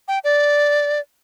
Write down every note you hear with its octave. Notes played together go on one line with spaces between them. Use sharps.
G5
D5